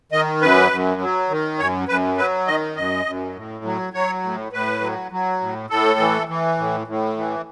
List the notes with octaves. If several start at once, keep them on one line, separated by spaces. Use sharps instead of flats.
D#3 D#5
F#2 B4
F#2
F#3
D#3
F#2 C#5
F#2 B4
F#3 B4
D#3 D#5
F#2 D#5
F#2
A2
F#3
F#3 C#5
A2
A2 B4
F#3
F#3
A2
A2 A4
E3
E3
A2
A2
E3